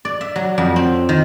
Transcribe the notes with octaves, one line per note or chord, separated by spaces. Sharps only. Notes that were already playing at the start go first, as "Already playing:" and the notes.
D5
E5
F#3
F2
C4
D#3